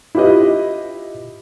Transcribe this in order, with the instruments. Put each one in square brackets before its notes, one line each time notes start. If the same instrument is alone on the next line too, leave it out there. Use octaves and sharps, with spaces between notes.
[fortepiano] E4 F4 G4 B4 D#5